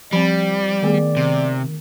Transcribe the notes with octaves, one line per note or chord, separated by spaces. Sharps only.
F3 G3 C4 D5 B5
D#3 A3 B3 G#4
C3